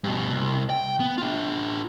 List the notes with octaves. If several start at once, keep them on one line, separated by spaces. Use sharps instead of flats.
G2 B2
C2
G5
B3
D4 F4